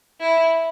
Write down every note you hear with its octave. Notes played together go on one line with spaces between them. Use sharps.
E4